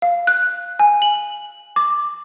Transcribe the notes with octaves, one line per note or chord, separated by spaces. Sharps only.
F5
F#6
G#5
F#7
D6